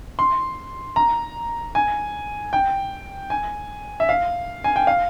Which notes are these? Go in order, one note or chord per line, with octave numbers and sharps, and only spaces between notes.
C6
A#5
G#5
G5
G#5
E5
F5
G#5
G5
F5